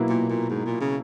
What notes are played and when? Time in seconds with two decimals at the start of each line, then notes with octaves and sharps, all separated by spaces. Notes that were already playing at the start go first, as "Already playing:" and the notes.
Already playing: B2 F#3 A#3 E4
0.09 A#2
0.29 A#2
0.50 G#2
0.66 A#2
0.81 C#3